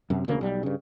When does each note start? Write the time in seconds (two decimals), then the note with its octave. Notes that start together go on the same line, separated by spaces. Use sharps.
0.10 F#2 C3
0.28 E1 D2 C#3 A#3
0.41 B1 G3
0.63 G2 C#3